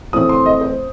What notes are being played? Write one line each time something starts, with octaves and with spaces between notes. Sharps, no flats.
A2 E3 A3 C4 D#6
C6
D#5
C5